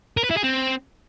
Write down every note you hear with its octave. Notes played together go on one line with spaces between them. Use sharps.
A#4
B4
E4
G#4
C4